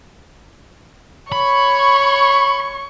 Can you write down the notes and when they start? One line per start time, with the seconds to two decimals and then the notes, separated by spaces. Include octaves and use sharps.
1.32 C#5 B5 C#6